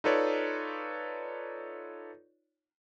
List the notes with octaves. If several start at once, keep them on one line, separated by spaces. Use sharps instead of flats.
D#4 F4 A4 B4 C#5 D5